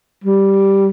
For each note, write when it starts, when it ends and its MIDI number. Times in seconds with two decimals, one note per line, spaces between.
0.24 0.87 55